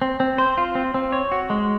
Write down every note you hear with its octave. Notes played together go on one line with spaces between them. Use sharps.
C4
C4
C5
F4
C4
C4
C#5
F#4
G#3